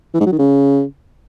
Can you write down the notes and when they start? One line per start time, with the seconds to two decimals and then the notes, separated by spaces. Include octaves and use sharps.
0.14 E3
0.20 G#2
0.26 F#3
0.32 D#3
0.38 C#3